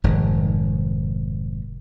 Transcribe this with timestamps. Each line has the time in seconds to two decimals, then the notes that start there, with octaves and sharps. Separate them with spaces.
0.04 F1 G#2 D#3